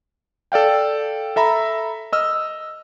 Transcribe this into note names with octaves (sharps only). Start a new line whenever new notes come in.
A4 D5 F5 G5
A4 E5 A#5 B5
D#5 E6 F6